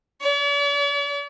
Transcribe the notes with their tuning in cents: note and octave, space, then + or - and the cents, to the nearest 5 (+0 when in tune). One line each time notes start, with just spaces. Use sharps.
D5 -45